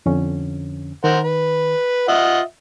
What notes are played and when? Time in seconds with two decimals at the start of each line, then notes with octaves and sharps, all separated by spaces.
0.06 F2 D3 C#4
1.04 D#3 A#4 C5 F#5
1.24 B4
2.08 F4 D#5 E5 F#5